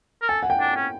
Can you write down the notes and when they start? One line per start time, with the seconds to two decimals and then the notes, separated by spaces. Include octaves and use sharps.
0.22 A#4
0.29 A4 G#5
0.43 F#5
0.50 G5
0.60 D4
0.76 C#4